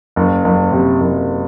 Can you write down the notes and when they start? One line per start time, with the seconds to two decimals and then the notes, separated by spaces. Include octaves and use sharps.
0.16 F#1
0.44 F#1
0.72 C3
1.01 F#1